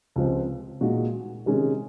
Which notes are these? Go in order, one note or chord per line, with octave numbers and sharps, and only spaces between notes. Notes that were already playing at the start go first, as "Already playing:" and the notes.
C#2 C3 F3 C4
A#2 G#3 D#4 F#4
C3 D#3 G#3 C#4